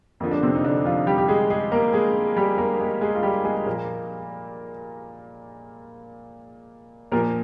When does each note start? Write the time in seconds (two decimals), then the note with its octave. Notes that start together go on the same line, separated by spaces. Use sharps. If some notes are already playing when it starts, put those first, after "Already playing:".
0.20 F2 D3 F3 A#3
0.31 D4
0.42 C3 C4
0.55 D#4
0.64 D3 D4
0.85 F3 F4
1.07 G3 G4
1.18 G4
1.28 G#3 G#4
1.50 G#3 G#4
1.72 A#3 A#4
1.93 G#3 G#4
2.37 G3 G4
2.58 A#3 A#4
2.80 G#3 G#4
3.01 G#3 G#4
3.15 F4
3.23 G3 G4
3.45 G#3 G#4
3.57 G#4
3.66 A#2 F3 A#3 A#4
7.12 A#2 F3 A#3 A#4